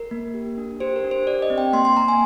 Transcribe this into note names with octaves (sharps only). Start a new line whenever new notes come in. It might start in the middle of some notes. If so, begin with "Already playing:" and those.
Already playing: A#4
A#3
G4
D4
G4 C5
A#4
D4
C5
G4 D5
D#5
C4
G5
A#3 C6
C6
A#3 A#5
G#5